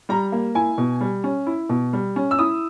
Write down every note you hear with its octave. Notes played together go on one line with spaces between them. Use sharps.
G3 A#5
A#3
E4 G#5
B2
G3
C#4
E4
B2
G3
C#4
E6
E4 D#6